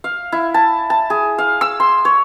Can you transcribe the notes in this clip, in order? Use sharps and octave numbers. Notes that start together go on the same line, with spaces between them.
F5
E4
A5
A5
G#4
F5
E6
C6
C#5